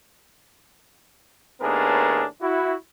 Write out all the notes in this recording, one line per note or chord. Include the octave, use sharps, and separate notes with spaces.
D#2 A2 B3 D4 G#4 A#4
E4 F#4